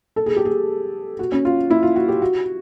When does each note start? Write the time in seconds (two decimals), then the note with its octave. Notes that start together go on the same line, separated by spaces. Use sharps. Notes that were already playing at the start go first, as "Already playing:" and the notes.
0.16 A4
0.26 G#4
0.36 G4
0.45 G#4
1.19 F#4
1.32 C#4
1.45 F4
1.70 E4
1.83 F4
1.96 F#4
2.08 G4
2.22 F#4